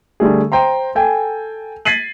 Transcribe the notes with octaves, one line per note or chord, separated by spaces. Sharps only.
D3 G3 A3 G#4
C5 G5 A#5 C6
A4 G5 G#5
G#6 A6 B6 C7 D#7 F#7